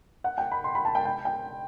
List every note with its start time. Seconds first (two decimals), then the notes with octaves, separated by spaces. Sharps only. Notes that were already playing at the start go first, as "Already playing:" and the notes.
0.24 F#5
0.38 G5
0.52 B5
0.64 C6
0.75 B5
0.85 A5
0.95 G5
1.05 G5
1.25 G5